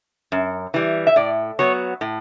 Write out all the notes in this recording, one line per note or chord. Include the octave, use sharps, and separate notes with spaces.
F#2
E3 G3
E5
A2 D5
F#3 B3 C#5
A2